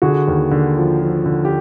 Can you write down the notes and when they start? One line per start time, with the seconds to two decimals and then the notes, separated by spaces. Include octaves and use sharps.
0.02 D3 F#4 G#4
0.28 D#2
0.51 D3
0.77 F3
1.02 F3
1.26 D3
1.45 G4